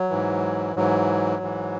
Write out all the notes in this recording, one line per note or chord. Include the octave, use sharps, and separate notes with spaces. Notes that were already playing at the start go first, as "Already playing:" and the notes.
Already playing: F#3
G#2 E3
G#2 E3 F#3
G#2 E3